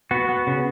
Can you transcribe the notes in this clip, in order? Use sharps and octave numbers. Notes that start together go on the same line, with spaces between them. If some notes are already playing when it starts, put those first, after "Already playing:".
B3 F#4
B3
C#3